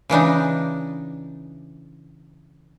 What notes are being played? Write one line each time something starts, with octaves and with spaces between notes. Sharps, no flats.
C#3 E3 D4 D#4